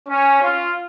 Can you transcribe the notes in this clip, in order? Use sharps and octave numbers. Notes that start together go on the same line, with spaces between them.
C#4
F4